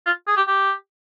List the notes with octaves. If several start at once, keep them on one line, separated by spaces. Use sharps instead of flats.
F4
G#4
G4
G4